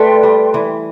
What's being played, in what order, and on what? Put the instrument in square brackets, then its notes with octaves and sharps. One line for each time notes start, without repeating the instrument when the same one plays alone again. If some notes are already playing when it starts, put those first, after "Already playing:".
Already playing: [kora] A3 [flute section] B4 D5 G5 C6
[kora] G3
E3